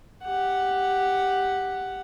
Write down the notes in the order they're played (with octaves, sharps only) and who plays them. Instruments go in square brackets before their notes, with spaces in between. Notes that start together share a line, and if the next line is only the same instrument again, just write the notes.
[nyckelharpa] G4 F#5